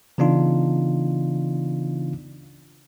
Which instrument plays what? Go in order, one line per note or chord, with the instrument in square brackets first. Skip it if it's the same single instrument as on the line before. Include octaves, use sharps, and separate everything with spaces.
[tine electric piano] C#3 E3 B3 D4 D#4 F4